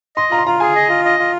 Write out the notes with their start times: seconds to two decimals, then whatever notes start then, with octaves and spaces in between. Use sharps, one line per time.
0.17 D#5 C6
0.31 F4 A#5
0.38 C6
0.46 F4 A#5
0.60 G#4 G#5
0.76 D#5
0.89 F4
1.05 D#5
1.19 F4